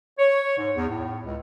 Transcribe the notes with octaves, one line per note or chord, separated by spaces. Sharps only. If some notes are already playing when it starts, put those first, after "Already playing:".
C#5
G#2
E2
A2
C#2